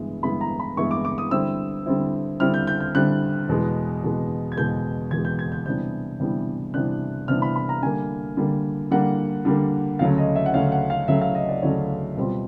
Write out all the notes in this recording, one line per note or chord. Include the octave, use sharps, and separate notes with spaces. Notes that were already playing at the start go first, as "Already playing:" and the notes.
Already playing: G2 E3 G#3 B3 E4
G2 E3 G#3 B3 E4 B5
A#5
B5
G2 E3 G#3 B3 E4 C#6
D6
D6
D#6
D3 G3 C4 E4 E6
D3 G3 C4 E4
D3 G3 C4 E4 F6
G6
G6
G6
D3 G3 C4 E4 F#6
E2 B2 G#3
E2 B2 G#3
G#6
E2 B2 G#3 G6
E2 B2 G#3 G#6
G6
G#6
G6
C3 E3 G3 B3 D4 G6
C3 E3 G3 B3 D4
C3 E3 G3 B3 D4 F#6
C3 E3 G3 B3 D4 F6
B5
B5
A#5
D3 G3 A#3 G#5
D3 G3 A#3
D3 G3 A#3 F#5
D3 G3 A#3
D2 C#3 F#3 A3 C#4 F5
D#5
E5
F#5
D2 C#3 F#3 A3 C#4 F5
F#5
F5
D2 C#3 F#3 A3 C#4 E5
F5
D#5
D5
D2 C#3 F#3 A3 C#4 C#5
B2 G3 C4 F4